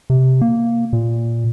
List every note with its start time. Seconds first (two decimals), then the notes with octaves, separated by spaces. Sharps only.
0.10 C3
0.41 A#3
0.93 A#2